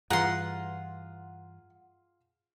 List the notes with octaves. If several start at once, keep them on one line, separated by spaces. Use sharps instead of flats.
G2 E3 F4 G#4 F#5 A#5 C6